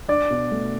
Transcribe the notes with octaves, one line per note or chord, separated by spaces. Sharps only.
D4 D5
B2
A3